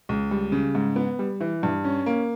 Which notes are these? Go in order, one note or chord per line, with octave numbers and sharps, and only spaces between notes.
C#2
G3
C#3
G#2
B3
G3
E3
G2
C#4
A#3